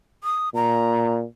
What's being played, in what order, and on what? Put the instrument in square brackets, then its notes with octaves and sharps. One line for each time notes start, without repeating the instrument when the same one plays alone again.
[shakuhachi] D#6
[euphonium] A#2 [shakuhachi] A#5